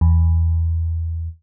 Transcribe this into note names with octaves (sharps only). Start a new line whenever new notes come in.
E2